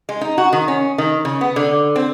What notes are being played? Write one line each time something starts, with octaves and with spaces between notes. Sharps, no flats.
G#3
D#4
F#4
D#3
C#4
D#3
C#3
B3
D3
C4